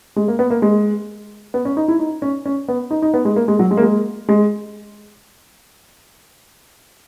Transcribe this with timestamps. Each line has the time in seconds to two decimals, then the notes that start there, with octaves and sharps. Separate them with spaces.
0.16 G#3
0.28 A#3
0.39 B3
0.50 A#3
0.62 G#3
1.54 B3
1.65 C#4
1.77 D#4
1.88 E4
1.99 D#4
2.22 C#4
2.46 C#4
2.68 B3
2.91 D#4
3.02 D#4
3.14 B3
3.25 G#3
3.36 A#3
3.48 G#3
3.59 F#3
3.71 G#3
3.77 A#3
3.83 G#3
4.29 G#3